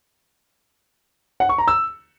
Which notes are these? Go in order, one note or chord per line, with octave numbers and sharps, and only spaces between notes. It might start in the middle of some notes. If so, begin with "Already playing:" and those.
F#5
C#6
A#5
E6